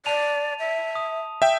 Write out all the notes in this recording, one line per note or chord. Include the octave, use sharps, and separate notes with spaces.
D5 A5 D#7 F7
E5
D#6
E5 G5